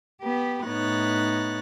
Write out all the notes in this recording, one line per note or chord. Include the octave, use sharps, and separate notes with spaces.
B3 G4
A2 B3 D#4 C#5 F#6 A6